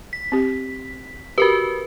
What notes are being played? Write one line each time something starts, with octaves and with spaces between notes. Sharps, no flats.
B6
C4 G4
F#4 G4 A#4 B4